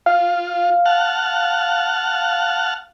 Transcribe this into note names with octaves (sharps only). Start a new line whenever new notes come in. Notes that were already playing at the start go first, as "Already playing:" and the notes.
F4 F5
F#5 A5 F6